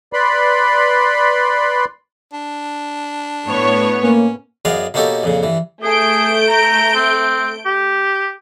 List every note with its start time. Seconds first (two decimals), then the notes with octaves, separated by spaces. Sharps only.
0.13 B4 D5 B5 C6
2.33 D4
3.47 A2 B3 C#5
4.03 A#3 C#4
4.65 F#2 B3 G#4 D5 D#5 F5
4.94 B2 A#3 C#4 D#4 G4 A4
5.23 F2 A#2 C#3
5.43 G2 E3
5.83 A3 G#4 G6 D7
6.49 A#5
6.95 C4
7.66 G4